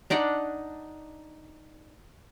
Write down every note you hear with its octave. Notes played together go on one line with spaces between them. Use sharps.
D4 D#4 D5 F#5